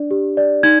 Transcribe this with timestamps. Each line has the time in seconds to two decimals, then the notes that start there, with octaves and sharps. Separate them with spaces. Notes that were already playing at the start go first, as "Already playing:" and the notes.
Already playing: D4 D5
0.11 G4
0.37 D5
0.63 D#4 G#6